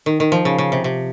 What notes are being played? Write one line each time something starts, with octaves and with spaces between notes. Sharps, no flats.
D#3
D#3
F3
C#3
C#3
C3
C3